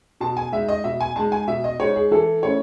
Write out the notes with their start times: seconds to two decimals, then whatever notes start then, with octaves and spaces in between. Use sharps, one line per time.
0.20 B2 A5
0.37 G#5
0.52 G#3 D#4 E5
0.69 D#5
0.84 B2 E5
1.01 G#5
1.16 G#3 D#4 A5
1.32 G#5
1.48 B2 E5
1.64 D#5
1.80 G#3 D#4 C#5
1.96 G#4
2.11 E3 A4
2.43 A3 C#4 E4 C#5